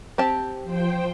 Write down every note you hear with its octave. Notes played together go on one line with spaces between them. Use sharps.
C4 G4 A5
F3 C5 G5